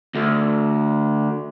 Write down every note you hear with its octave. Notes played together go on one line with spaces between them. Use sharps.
D2